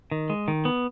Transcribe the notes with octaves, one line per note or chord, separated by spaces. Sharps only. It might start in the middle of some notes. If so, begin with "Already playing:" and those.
D#3
G#3
D#3
B3